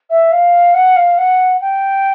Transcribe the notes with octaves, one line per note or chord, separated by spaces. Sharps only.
E5
F5
F#5
F5
F#5
G5